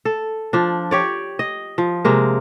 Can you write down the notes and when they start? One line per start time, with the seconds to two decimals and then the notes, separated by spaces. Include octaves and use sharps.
0.05 A4
0.53 F3 D4
0.91 G4 C#5 D5
1.39 D#5
1.78 F3
2.05 C3 G#3 A#3